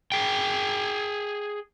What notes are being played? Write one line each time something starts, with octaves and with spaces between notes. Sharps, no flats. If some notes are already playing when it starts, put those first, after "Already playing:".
G#4 G5